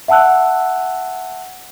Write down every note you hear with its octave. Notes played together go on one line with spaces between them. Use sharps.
E5 F#5 A5 E6 F#6